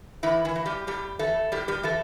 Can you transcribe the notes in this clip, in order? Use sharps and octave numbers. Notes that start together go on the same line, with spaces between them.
A2 E3 E4
E3 E4
E3
G3 G4
A2 G3 G4
E3 A3 A4
A2 G3 G4
G3 G4
E3 A3 A4